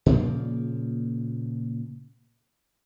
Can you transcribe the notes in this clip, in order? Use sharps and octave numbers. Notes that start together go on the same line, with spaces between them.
A#2 C#3 F3 A#3